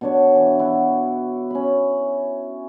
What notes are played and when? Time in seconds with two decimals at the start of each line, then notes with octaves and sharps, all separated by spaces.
0.01 B2 D4 C#5
0.36 E3
0.59 E4 F#4
1.50 C#4 B5